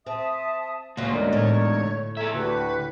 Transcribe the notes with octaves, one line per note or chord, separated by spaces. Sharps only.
C4 E5 A5 D#6
D2 F#3 A#3 F#4 G#5 C6 D#6
G#2 D3 A#4 D5 D#5
A2 C#5
G#4 A4 E5 A#5 G#6
D2 F#4 G4 B4